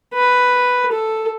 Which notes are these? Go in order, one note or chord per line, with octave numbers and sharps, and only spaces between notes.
B4
A4